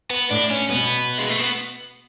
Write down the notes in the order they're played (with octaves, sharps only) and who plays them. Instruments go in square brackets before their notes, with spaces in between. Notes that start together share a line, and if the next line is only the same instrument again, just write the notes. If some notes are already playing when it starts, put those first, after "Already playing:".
[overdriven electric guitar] B3
[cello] A2 [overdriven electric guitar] D4
[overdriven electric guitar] C#4
[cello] B2 [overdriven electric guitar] B3
[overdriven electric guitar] G#3
A3
B3